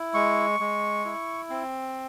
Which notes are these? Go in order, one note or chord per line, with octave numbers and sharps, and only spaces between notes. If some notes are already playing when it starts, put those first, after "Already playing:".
Already playing: E4
G#3 C#6
G#3
E4
C4